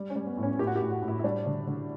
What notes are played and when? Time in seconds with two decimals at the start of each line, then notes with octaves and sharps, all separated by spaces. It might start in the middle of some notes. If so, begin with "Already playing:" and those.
Already playing: G3
0.10 C#4
0.16 G3
0.27 B3
0.37 A2
0.43 C#4
0.59 A2 G4
0.67 F#4
0.76 G4
0.81 A2
0.92 F#4
1.02 A2
1.08 E4
1.19 E4
1.24 G3 D4
1.46 D3
1.67 D3